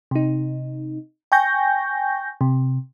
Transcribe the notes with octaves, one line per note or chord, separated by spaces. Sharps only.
C3 D#4
G5 G#5 C#6 G6 A#6
C3